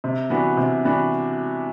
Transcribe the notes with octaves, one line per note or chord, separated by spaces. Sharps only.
C3
E3 B3 D4 F#4
C3
E3 B3 D4 F#4